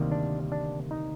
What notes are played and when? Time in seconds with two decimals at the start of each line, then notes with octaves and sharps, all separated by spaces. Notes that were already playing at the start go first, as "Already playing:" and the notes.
Already playing: D2 C3 D#3 G3 A#3
0.12 D4
0.52 D4
0.91 D#4